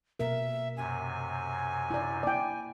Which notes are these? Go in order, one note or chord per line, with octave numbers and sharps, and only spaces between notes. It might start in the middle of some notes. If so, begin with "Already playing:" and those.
B2 A#3 A#4 E5
F#2 C3 G#5
E4 D5
A#3 E4 D5 G5